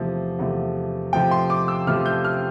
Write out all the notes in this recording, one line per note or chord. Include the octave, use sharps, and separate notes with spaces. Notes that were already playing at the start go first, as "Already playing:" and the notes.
Already playing: E2 C3 F3 A3
E2 C3 F3 A3
C3 F3 A3 G5
C6
D6
E6
C3 F3 A3 F6
G6
F6